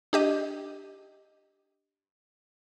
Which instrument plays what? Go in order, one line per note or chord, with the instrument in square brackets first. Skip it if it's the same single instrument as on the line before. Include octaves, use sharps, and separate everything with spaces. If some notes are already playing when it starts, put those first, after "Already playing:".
[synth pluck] D4 G4 D#5